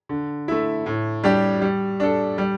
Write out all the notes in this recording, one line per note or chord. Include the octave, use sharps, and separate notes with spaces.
D3
A3 E4
A2
G3 D4 G4
G3
D4 A4
G3